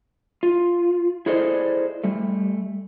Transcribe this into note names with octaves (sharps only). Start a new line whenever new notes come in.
F4
E4 G#4 A4 C5 D5 D#5
G3 A3